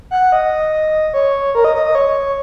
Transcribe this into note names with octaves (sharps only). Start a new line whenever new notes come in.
F#5
D#5
C#5
A#4
D#5
D#5
D#5
C#5